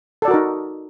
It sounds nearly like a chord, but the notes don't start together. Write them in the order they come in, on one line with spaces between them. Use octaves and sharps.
A4 D5 F#4 A#4 D#4